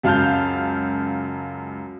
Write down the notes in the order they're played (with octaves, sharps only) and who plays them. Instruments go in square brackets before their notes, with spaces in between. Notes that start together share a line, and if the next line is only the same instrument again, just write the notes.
[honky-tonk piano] C#2 F#2 F5 A5 F6 G6